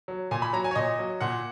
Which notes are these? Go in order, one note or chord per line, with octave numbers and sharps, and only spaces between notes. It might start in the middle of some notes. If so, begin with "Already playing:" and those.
F#3
A#2 G#5
B5
F#3 A#5
G#5
C#5
A#2 D#5
F#3
A#2 F#5